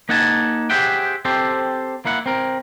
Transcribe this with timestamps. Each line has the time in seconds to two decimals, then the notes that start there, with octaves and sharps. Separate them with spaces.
0.09 A#3 D#4 F#5 G#5 A5
0.70 G4 G#4 C5 E5 F#5 G5
1.25 C4 G4 A4 C5
2.05 A#3 E4 F#5
2.26 C4 A#4